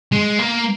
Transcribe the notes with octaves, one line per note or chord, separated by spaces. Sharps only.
G#3
A#3